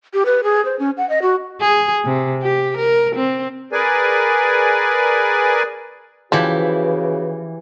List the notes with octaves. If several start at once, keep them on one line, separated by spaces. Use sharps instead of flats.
G4
B4
G#4
C5
C#4
F#5
D#5
F#4
G#4
C3
G4
A#4
C4
G#4 A#4 B4 D5 G#5
C#3 E3 F3 F#4 G4 B4 B5